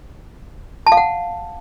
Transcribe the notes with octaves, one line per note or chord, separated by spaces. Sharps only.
A5
F5
F#5